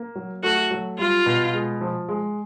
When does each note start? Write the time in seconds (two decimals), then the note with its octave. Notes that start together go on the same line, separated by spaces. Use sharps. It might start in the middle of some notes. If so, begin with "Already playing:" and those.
Already playing: A#3
0.15 F#3
0.43 A3 F#4
0.71 F#3
0.98 G3 F4
1.26 B2
1.53 G#3
1.81 F3
2.08 G#3